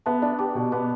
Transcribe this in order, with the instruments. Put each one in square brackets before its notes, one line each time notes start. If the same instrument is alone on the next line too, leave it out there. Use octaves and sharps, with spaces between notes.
[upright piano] B3 [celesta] E5 A5
[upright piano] D4 [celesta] E5 A5
[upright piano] G4 [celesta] A5 D6
[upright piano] B2
[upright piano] B3 [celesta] A5 D6